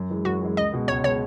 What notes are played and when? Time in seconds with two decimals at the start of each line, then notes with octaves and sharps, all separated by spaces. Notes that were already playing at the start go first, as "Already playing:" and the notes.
Already playing: F#2
0.10 E3 G#3
0.25 F#2 F#4
0.41 E3 G#3
0.57 C#2 D#5
0.72 B2 G#3
0.88 C#2 C#5
1.04 B2 G#3 C#5